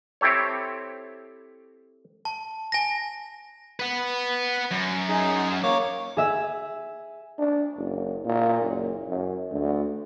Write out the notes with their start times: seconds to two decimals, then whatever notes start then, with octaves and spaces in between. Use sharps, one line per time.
0.21 C4 E4 G4 A4 C#5
2.25 A5
2.72 G#5 A#6
3.79 B4 F#5
4.72 F#2
5.09 D#4 G#4
5.63 A#3 C#5 D6
6.17 G#4 E5
7.38 D4
7.76 F#1
8.25 A#2
8.61 F#1
9.08 F#2
9.51 D2